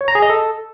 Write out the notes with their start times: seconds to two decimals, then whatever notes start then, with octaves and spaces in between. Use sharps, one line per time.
0.01 C#5
0.08 A#5
0.15 G#4
0.22 D#5
0.30 A4